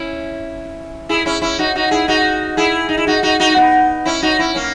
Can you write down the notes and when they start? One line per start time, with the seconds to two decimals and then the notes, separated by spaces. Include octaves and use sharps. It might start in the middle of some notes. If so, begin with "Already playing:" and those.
Already playing: C#4 E4
1.09 E4 G#4
1.26 C#4 E4
1.42 C#4 E4
1.58 D#4 F#4
1.75 D#4 F#4
1.91 E4 G#4
2.08 D#4 F#4
2.57 E4 G#4
2.89 D#4
2.98 E4
3.07 D#4 F#4
3.23 D#4 F#4
3.40 D#4 F#4
3.56 B3 D#4
4.05 C#4 E4
4.22 D#4 F#4
4.39 C#4 E4
4.55 A#3 C#4